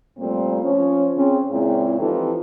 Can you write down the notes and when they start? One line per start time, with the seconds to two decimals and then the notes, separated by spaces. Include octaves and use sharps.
0.19 A#2 F3 G3 A3 A#3 C4
0.63 F3 C#4 C#5
1.16 C#3 C4 C#4
1.51 A#2 C#3 G#3 C4 C#4 E4
1.99 E3 F3 C4 D#4 G4 A4